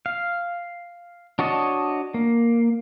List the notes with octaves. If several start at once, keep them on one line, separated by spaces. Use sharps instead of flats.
F5
D4 F#4 C#5 D#5 A5
A#3